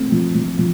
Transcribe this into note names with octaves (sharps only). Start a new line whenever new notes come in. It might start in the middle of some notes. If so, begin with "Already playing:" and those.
Already playing: A3 C4
F3
F3
F3